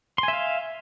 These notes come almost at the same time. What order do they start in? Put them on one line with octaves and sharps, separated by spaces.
C6 G#5 E5 F5